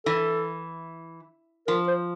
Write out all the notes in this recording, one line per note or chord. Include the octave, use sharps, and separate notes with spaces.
E3 A4
F3 A#4
C5